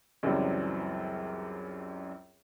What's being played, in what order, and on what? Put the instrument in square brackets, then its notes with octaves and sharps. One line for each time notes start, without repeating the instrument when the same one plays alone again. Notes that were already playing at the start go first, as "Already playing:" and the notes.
[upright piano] C#2 F#2 E3 F#3 G3 C4